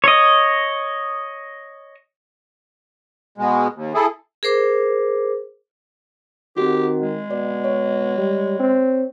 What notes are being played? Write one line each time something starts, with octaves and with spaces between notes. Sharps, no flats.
C#5 D#5
B2 G#3
D#2
E4 G#4 A4
G#4 A#4 C5 D6
D#3 C4 F#4 G4
G#3
B2 D5
C#5
G3
C4